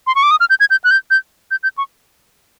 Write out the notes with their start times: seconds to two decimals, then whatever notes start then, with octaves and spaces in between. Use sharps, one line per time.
0.07 C6
0.15 C#6
0.23 D6
0.31 D#6
0.40 F6
0.50 G6
0.60 G#6
0.70 G6
0.84 F#6
0.91 G6
1.11 G6
1.51 G6
1.63 G6
1.78 C#6